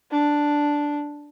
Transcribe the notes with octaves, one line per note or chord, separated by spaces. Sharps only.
D4